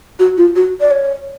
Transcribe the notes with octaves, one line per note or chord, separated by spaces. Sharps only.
F#4
F4
F#4
D5
C#5